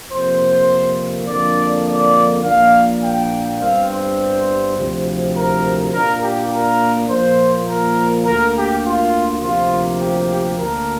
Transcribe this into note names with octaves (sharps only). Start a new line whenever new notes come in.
F2 C3 A#3 C5
F2 D3 A#3 D4 D5
D5
A#1 A#2 A#3 D4 F5
G5
G1 G2 G3 C4 F5
C5
D2 C3 F3
A#4
A#2 A#3 D4 A#4
G4
A#4
A#2 F3 A#3 C5
A#4
D2 D3 A#3 A#4
G4
F4
D2 C3 F3 A#3 F4
G4
G4
D2 D3 A#3 D4 A#4